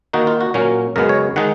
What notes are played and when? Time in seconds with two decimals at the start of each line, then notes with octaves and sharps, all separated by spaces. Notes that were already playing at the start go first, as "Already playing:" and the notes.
0.13 D#3 A#3 D#4 F#4
0.27 F4
0.41 F#4
0.54 A#2 F#3 A#3 C#4
0.96 F#2 C#3 G#3 B3 A#4
1.09 C#5
1.36 D#3 G#3 D#4 F#5